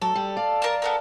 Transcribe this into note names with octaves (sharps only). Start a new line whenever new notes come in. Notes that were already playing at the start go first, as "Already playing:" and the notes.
F#3 A4
G3
D5 F5
A#4 A5
B3 A4 A#4